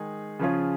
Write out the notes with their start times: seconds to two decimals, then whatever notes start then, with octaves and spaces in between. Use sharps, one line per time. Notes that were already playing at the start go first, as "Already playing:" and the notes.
Already playing: D#3 G#3 D#4 G#4
0.39 C#3 F3 C#4 F4 G#4